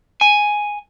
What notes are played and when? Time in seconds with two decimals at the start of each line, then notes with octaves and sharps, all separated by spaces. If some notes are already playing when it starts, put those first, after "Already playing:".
0.21 G#5